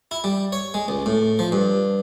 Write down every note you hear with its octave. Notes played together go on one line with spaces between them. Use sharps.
E4
G3
C#5
G#3
C#2
A2
F3
G2